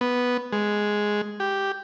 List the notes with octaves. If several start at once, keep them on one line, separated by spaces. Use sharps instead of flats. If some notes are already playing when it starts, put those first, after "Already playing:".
B3
G#3
G4